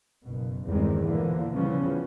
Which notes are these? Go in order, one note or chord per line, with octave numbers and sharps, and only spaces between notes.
F#1 B2
E2 G2 D#3 G3 G#3 C4
A#2 D3 E3 F3 A#3
C#3 E3 F3 G3 B3 C#4